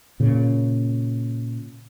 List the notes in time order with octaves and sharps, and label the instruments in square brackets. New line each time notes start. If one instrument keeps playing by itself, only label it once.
[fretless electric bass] A#2 C#3